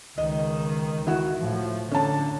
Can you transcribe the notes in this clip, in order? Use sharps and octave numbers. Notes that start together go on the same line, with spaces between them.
C#2 D#3 D#5
D#3 E4 F#4
A2 F3
D3 C#4 A5